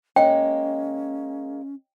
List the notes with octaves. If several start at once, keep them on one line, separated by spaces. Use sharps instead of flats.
G#3 A#3 C#4 C#5 D#5 G5